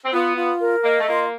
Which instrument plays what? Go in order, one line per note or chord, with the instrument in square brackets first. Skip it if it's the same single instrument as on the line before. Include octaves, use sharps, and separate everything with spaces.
[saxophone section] C4
[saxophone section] B3 [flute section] F4
[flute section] F4
A#4
[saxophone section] A#3 [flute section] D#5
[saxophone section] A3
[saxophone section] A#3 [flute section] F4